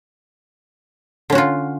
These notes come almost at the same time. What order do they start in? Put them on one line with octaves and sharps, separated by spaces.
D3 C#4 F#4 F4